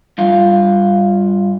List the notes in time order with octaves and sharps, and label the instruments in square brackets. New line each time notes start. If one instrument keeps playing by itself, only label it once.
[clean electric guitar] G2 F4